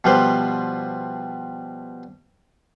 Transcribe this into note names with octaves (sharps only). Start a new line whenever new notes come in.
B2 F3 G3 B4 C5